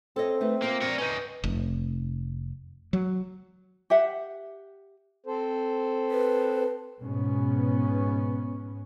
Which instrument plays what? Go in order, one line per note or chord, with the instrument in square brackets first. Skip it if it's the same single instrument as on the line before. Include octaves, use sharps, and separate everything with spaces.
[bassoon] C4 [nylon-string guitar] A4 C#5 D#5
[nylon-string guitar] A3 D#4 B4
[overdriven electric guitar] A#3 [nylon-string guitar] F4 C5
[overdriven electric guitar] A#4 C#5 [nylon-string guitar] D5
[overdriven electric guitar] C#4 D#4 [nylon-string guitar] B4
[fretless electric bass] F1
F#3
[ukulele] G4 E5 F#5
[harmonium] C4 A4 C5
[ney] B4
[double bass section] G#2 B2 B3 C#4